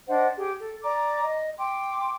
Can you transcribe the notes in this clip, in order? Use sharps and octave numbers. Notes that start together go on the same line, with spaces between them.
D4 C5 D#5 F#5
G4 G#4
A4
D5 A#5 D6
D#5
G5 C6 D6